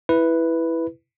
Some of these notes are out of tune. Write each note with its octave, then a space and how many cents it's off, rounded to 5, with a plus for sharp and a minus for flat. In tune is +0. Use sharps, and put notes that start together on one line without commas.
E4 +0 B4 +0